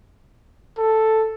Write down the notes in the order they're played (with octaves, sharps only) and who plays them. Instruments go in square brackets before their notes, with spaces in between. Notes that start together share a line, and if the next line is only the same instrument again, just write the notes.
[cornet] A4